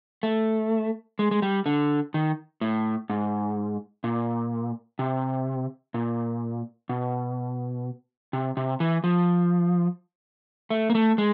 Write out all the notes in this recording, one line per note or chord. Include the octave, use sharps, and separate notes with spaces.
A3
G#3
G#3
G3
D3
D#3
A2
G#2
A#2
C3
A#2
B2
C3
C3
E3
F3
A3
A#3
A3
G#3